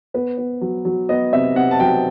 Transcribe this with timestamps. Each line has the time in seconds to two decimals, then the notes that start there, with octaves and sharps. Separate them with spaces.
0.14 B3 B4
0.38 B3
0.61 F#3
0.85 F#3
1.09 B3 D#5
1.33 C3 E5
1.56 C3 F#5
1.71 A5
1.80 F#3 G5